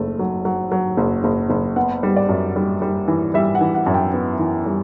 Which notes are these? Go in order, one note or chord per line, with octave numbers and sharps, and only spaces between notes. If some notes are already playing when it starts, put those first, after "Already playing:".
Already playing: F#1 A3
F#3
F#3
F#3
F#1
F#1
F#1
B3 F#5
G3
D5
F#2
G3
G3
E3
G3 E5
F#5
E3
F#5
F#2
G5
B3
E3
G3